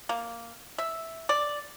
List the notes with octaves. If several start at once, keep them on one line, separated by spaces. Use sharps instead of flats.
A#3
E5
D5